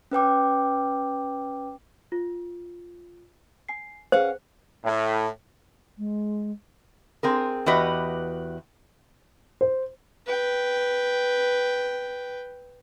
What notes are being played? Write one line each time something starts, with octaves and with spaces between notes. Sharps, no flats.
C#4 B4 G5 D6
F4
G#5 C7
C#4 G#4 B4 C5 F5 F#5
A2
G#3
C4 G#4 A#4
E2 F#4 G4 B4 D#5
C5
B4 G5